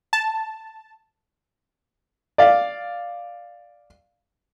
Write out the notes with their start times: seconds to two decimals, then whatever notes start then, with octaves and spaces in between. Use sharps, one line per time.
0.13 A5
2.38 D5 F5